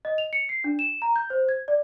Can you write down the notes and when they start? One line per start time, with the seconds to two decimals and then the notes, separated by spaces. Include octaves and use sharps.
0.05 D#5
0.18 F7
0.33 C#7
0.49 C7
0.64 D4
0.79 E7
1.02 A#5
1.16 G6
1.30 C5
1.49 G#6
1.68 D5